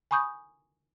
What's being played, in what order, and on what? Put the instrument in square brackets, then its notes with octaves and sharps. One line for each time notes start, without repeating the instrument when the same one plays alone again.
[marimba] G#5 B5 C#6 D#6 G6